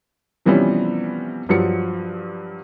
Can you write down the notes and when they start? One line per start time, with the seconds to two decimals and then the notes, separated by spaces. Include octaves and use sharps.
0.46 C3 E3 F3 G3 B3 C#4
1.49 G2 F3 F#3 C#7